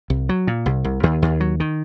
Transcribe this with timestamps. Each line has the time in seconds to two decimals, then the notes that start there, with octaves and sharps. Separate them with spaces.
0.10 C2
0.29 F#3
0.47 A#2
0.66 C2
0.84 C2
1.03 D#2
1.22 D#2
1.40 F#3
1.60 D#3